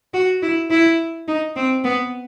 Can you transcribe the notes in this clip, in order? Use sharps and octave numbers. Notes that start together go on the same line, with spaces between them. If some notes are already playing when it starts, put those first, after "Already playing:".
F#4
E4
E4
D#4
C4
B3